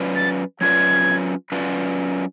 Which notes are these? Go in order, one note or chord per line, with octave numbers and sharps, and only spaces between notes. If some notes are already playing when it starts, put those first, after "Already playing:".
Already playing: F#3 C#4 F4 B4 D5
A6
F#3 C#4 F4 B4 D5 G#6
F#3 C#4 F4 B4 D5